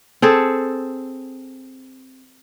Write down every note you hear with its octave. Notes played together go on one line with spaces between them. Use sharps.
C4 G#4 A4